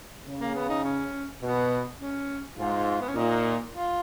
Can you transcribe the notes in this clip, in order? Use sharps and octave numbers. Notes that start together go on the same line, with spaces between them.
C#3
A#3
B3
D#4
C#4
B2 B3
C#4
G#2 F4
B3
C#4
A#2 D#4
F4